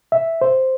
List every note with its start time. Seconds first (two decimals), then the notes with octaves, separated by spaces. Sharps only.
0.12 E5
0.41 C5